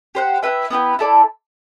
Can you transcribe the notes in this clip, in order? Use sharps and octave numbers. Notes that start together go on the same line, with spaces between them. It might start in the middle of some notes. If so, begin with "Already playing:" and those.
G4 C5 F#5
E4 B4 E5 G5
B3 E4 G4 B4
E4 A4 D5